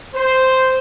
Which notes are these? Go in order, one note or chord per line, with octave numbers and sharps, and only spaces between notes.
C5